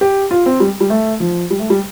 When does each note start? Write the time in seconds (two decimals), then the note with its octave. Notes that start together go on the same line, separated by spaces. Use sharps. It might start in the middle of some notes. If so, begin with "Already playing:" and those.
0.01 G4
0.31 F4
0.46 C4
0.60 G3
0.80 G3
0.90 A3
1.20 F3
1.50 G3
1.60 A3
1.70 G3